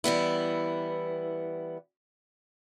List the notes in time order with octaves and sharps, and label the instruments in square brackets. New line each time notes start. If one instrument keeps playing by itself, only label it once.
[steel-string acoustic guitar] E3 G3 B3 E4